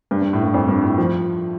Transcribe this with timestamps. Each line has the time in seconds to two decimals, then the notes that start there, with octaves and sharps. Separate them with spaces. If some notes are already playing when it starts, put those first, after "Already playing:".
0.11 G2
0.22 G2
0.33 A2
0.43 G2
0.54 F2
0.69 G2
0.83 A2
0.98 F3